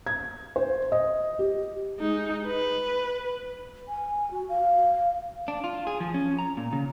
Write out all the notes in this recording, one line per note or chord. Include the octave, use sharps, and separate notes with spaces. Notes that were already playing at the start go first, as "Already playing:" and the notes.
G#6
C5
D#5
G4
G#3 D#4
B4
G#5
F#4
F5
D4
F4
G#4
F3
C#4
A#5
A#2
C#3